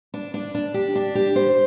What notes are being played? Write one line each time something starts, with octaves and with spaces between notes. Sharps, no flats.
D4
D4
D4
G4
D4
G4
C5